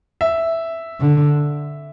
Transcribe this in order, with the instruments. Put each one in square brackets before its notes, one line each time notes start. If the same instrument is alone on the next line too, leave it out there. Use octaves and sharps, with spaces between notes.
[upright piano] E5
[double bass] D3